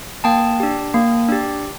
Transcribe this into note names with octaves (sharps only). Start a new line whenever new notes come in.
A#3 G5 A5
D4 G4
A#3
D4 G4